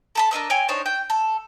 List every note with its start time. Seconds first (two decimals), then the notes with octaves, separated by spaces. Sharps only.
0.15 A4 A5 B5
0.31 A#3 D4 D#5 E6
0.50 C#5 G5 G#5
0.68 D4 D#4 C5 C#5
0.86 G5
1.10 A4